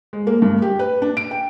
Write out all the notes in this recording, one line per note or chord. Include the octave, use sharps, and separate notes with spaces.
G#3
A#3
G2
G4
B4
D4
D7
G5